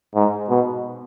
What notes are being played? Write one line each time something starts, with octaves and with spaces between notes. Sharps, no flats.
G#2
B2